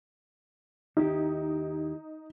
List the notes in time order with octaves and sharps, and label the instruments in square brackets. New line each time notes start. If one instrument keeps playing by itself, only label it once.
[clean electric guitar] D#2 E4 G4 [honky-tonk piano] D#4